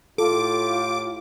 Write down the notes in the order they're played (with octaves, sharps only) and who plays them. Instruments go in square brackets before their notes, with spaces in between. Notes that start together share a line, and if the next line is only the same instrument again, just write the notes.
[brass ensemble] A2 G4 [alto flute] F4 [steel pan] A4 [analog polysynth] D6